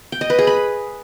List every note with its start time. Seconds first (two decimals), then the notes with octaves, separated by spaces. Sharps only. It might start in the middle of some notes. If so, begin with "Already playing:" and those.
0.12 G5
0.21 D#5
0.30 B4
0.39 G#4
0.47 B5